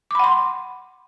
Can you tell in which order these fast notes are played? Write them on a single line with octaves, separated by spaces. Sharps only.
D6 B5 F#5 C6